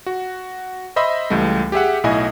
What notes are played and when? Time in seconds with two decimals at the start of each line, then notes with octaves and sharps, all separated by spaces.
0.06 F#4
0.96 C5 D#5 E5 B5 C6
1.30 C#2 E3 G3 A3
1.72 G4 G#4 E5 F#5
2.04 B1 A2 E4 D#5 G#5